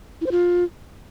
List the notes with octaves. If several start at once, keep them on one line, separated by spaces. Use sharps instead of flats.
E4
C5
F4